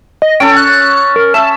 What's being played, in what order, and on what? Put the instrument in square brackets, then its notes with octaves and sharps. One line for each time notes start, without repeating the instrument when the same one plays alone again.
[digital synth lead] D#5
[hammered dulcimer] C#4 A4 [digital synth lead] G5
[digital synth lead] F#6
A#4
[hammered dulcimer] E5 [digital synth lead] A5